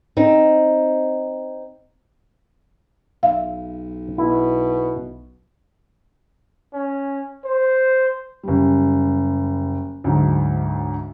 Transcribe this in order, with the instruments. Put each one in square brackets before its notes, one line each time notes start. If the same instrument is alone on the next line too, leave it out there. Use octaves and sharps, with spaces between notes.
[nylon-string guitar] C4 D#4
[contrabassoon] B1 [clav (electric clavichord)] E5 [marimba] F5
[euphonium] B2 [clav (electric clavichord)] E4
[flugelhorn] C#4
C5
[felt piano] F#1 G3
D2 G#2 F#3